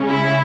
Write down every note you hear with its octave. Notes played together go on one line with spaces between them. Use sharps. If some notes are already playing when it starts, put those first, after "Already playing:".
Already playing: C#3 G#3 C#4
E4